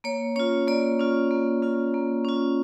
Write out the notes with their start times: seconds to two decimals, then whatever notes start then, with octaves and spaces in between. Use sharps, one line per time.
0.04 A#3 C#5
0.36 C#4 F4 C#5
0.68 A#3 D5
0.99 C#4 F4
1.31 A#3
1.63 C#4 F4
1.94 A#3
2.25 C#4 F4